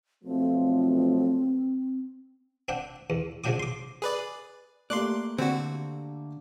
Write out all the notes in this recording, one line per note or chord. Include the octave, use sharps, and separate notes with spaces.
B1 F3 A3 C4
C4 D4 F#5 G5
E2
C#3 F3 F#3 D4 G5 D6
C6 D6
G#4 B4 D5
A3 A#3 G4 D5 C6 D6 F#6
D3 C4 F#4